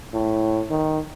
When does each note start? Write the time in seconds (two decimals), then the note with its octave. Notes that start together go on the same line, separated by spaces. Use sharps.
0.14 A2
0.71 D#3